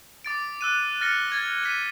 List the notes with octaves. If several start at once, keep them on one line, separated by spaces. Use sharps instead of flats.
D6 A6 D7
E6 F#6 D#7
F6 A6 A#6 C#7 G7
G#6 A6 G7
B6 D#7 G7